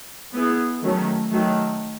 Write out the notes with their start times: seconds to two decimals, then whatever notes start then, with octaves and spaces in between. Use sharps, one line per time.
0.34 B3 E4 G#4
0.83 D#3 F#3 A3 C#4
1.31 D#3 F#3 A3